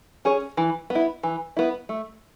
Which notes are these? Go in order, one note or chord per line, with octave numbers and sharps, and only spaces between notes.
C#4 G#4 C#5
E3
B3
E4
E3
B3 E4
A3